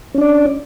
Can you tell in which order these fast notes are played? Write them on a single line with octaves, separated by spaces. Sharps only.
C#4 D4 D5